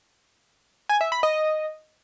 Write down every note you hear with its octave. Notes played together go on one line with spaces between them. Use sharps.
G#5
E5
B5
D#5